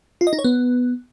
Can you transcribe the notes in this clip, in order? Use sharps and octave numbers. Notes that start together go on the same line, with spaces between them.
F4
D#5
D#4
C#5
B3